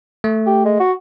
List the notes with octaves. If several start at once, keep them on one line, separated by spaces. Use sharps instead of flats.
A3
G4
G#3
F#4